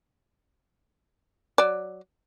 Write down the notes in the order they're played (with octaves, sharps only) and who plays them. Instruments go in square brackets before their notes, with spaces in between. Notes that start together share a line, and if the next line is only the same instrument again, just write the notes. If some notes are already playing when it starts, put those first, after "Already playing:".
[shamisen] F#3 D5